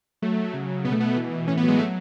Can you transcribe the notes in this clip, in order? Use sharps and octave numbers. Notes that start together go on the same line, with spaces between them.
F#3 A3
F#3
C#3
C#3
B2 B3
A3
B2 B3
E3
E3
A2 C#4
B3
F#3 G#3
F#3 A3